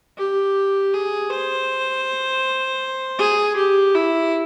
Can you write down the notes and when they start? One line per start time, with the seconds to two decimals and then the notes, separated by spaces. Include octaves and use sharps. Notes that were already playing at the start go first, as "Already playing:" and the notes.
0.18 G4
0.94 G#4
1.30 C5
3.19 G#4
3.56 G4
3.95 E4